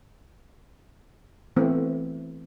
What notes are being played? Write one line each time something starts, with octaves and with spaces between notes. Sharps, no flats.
E3 A3 B3 C4